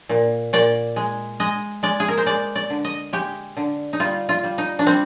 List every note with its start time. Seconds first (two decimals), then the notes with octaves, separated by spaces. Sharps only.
0.09 A#2
0.53 A#2 D5
0.96 G#3
1.40 G#3 D#5
1.83 G#3 D5
2.00 G#4
2.08 A#4
2.18 C5
2.26 G#3 D5
2.56 D5
2.70 D3
2.85 D#5
3.13 G#3 G4
3.57 D3
3.93 D#4
4.00 G3 F4
4.29 F4
4.44 G3
4.58 D#4
4.79 D4
4.87 G3 C4